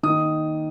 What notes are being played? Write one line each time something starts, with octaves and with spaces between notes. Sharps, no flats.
D#3 A#3 D#4 D#6